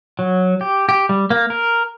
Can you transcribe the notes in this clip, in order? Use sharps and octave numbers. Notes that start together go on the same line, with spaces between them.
F#3
G4
G4
G3
A#3
A#4